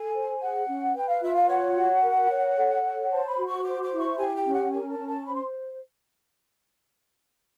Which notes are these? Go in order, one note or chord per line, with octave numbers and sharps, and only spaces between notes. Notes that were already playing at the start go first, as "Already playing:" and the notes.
Already playing: A4 G#5
C5
G#4 F#5
C#4
B4 G5
F5
F4 E5
F5
C#5 F#5
F#4
A#4
C#5
A4
C#5
C5 A5
B5
F#4
C#6
C5 D6
D6
E4
C#6
G4 G#5
G5
C#4
F#5
A#4 G#5
A5
C#4
A5
C5 B5
C6